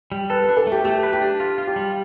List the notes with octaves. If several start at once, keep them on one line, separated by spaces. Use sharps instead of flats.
G3
A4 B4
B4
D4
A4
A3 G4
A3 G4
B4
G4
D4
F4
F4
G4
G3